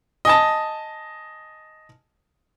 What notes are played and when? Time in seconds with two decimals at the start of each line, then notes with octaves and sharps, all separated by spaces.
0.25 D#5 G#5 A5